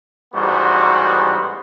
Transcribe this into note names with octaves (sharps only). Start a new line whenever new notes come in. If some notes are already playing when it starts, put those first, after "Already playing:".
A1 G#2 G3 B3 F#4 C5